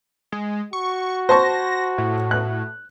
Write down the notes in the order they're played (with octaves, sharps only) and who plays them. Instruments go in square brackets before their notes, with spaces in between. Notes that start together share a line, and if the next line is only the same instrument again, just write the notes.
[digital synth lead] G#3
[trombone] F#4 [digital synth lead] C#6
[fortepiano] C5 A5 C#6 [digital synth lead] A#6
[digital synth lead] A2
[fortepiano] F#6